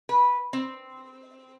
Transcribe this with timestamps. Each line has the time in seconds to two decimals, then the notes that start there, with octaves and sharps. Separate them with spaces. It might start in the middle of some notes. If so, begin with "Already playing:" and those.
0.09 B4
0.53 C4